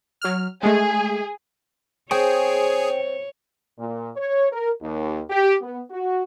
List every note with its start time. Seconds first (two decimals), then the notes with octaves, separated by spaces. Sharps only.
0.21 F#3 F6
0.63 G#3 A3 G#4
2.11 C4 G#4 C5 C#5 G5 C#6
3.78 A#2
4.16 C#5
4.52 A#4
4.82 D#2
5.30 G4
5.62 B3
5.91 F#4